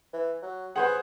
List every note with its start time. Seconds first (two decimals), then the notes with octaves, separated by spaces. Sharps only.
0.13 E3
0.42 F#3
0.76 G#4 B4 C5 F#5